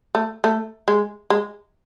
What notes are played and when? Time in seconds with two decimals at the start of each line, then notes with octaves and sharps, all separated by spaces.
0.15 A3
0.44 A3
0.88 G#3
1.30 G#3